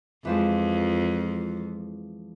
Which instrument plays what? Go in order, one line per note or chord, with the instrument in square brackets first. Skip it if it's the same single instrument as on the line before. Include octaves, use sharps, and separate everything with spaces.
[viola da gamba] F2 [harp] E3 F3 G#3